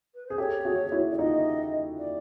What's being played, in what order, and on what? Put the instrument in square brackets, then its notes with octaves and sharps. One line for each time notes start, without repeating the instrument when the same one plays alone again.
[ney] B4
[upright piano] G#4 [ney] C5
[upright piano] G4 A4 [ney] C#5
[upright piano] F#4 G#4
E4 F#4
[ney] D5
[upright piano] D#4 F4 [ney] D#5
[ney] D5